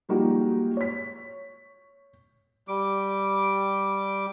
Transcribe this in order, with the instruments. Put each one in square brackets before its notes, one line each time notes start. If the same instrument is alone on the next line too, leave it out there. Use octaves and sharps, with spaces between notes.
[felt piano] F3 G3 G#3 A#3 D#4 F#4
C#5 B6
[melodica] G3 D6